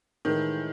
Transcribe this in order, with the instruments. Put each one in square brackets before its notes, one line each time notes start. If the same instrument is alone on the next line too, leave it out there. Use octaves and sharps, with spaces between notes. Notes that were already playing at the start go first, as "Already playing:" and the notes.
[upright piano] A2 E3 G#3 [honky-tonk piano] D#3